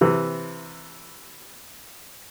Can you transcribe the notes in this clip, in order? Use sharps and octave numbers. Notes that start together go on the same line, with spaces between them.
C3 E3